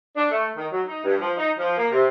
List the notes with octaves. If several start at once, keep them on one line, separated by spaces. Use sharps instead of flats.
D4
A3
D#3
F#3
D#4
G2
F3
D#4
F3
A#3
C3